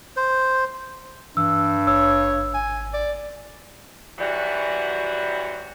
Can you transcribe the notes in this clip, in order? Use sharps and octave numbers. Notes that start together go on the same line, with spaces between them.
C5
G2 E3 E6
G#1 C#5 E6
G#5
D5
G#2 E3 F#3 G3 F#4 G5